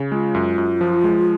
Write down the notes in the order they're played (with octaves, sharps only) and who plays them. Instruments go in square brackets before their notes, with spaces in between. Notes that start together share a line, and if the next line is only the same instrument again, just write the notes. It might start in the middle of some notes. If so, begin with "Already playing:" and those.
Already playing: [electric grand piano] C#3
[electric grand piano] G#3 [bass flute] F4
[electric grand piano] F#2
F#2
F3
G#3